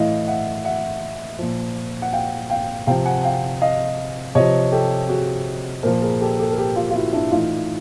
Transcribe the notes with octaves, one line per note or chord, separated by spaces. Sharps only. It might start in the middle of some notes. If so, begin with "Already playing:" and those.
Already playing: A2 E3 D#5 F5
E5 F#5
E5 F#5
A#2 F3
F#5
F5 G5
F5 G5
C3 F3 F5 G5
F#5 G#5
F5 G5
D#5 F5
C3 F3 C#5 D#5
G4 A4
F#4 G#4
A#2 F3 A#4 C5
G#4 A#4
G4 A4
G4 A4
A#4
G4 A4
F4 G4
F4
E4 F#4
D4 E4
A2 E3 D#4 F4